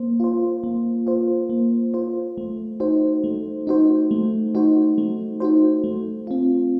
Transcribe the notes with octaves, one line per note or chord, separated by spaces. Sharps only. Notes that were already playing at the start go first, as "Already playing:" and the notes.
Already playing: A#3 C5
F4 C5
A#3
F4 C5
A#3
F4 C5
A3
D#4 F#4 C5
A3
D#4 F#4 C5
A3
D#4 F#4 C5
A3
D#4 F#4 C5
A3
C4 F4